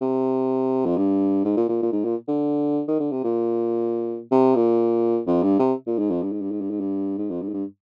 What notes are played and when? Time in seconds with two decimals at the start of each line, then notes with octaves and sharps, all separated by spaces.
0.01 C3
0.86 F2
0.97 G2
1.45 G#2
1.57 A#2
1.69 A#2
1.82 A#2
1.92 G#2
2.04 A#2
2.28 D3
2.88 D#3
3.00 D3
3.12 C3
3.24 A#2
4.31 C3
4.55 A#2
5.27 F2
5.43 G2
5.59 C3
5.87 A#2
5.99 G#2
6.10 F2
6.23 G2
6.32 G#2
6.41 G2
6.51 G#2
6.61 G2
6.70 G#2
6.80 G2
7.18 G#2
7.30 F2
7.42 G2
7.48 G#2
7.53 G2